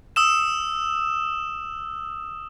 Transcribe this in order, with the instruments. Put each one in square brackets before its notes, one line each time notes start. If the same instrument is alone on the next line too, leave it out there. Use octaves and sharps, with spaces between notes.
[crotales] D#6 E6 E7